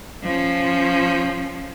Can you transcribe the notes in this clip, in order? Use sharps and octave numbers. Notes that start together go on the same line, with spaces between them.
F3 C#4